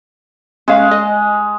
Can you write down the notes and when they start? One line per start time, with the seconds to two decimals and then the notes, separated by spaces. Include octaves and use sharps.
0.68 G#3 C#4 F5
0.91 D#5